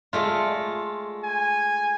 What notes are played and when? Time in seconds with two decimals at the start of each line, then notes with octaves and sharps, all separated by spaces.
0.13 G#3 A3 F4
1.23 G#5